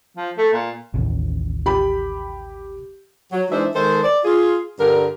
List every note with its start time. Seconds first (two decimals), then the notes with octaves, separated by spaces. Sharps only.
0.17 F3
0.38 A3
0.54 A#2
0.94 A1 D#2 C#3
1.66 G4 B5
3.32 F#3
3.50 E3 G#3 D4 D#4 C5 E5
3.75 D#3 G#3 A4 C5
4.03 D5
4.24 F4 G#4
4.79 G2 D3 G3 A#4